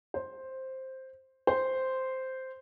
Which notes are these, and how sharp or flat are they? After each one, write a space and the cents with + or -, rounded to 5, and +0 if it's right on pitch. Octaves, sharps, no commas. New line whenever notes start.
C5 +5
C5 -5